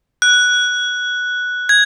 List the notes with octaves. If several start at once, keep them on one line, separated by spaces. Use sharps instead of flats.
F#6
G#6